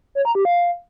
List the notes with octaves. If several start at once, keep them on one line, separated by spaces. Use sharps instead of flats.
C#5
A#5
G4
F5